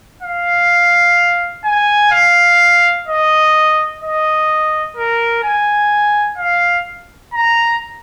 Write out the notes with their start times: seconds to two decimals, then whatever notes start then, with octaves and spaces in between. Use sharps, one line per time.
0.23 F5
1.65 G#5
2.12 F5
3.08 D#5
4.02 D#5
4.97 A#4
5.44 G#5
6.38 F5
7.34 A#5